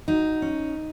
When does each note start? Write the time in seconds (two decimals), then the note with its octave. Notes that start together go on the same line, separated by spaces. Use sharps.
0.08 F#3 D#4
0.42 C#4